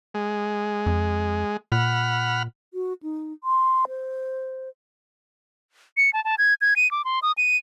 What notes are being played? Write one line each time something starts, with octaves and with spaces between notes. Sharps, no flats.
G#3
F2
A#2 F#5 B5 F6
F#4
D#4
C6
C5
C#7
A5
A5
G#6
G#6
D#7
D6
C6
D#6
D#7